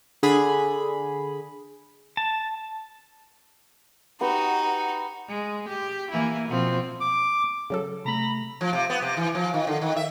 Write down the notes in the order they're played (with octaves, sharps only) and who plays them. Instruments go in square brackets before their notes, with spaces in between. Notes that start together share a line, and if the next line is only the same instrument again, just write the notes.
[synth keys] D3 G#4 B5
[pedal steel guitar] A5
[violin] D#4 F#4 [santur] G4 B4 F#5
[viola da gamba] G#3
G4
E3 A#3 E4
B2 F3 C4
[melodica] D6
[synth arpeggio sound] C#3 F#3 A4
[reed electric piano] C3 A3 [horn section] A#5 B5
[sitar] F3
C3
B3
C3
E3
F3
D#3
D3
D#3
E5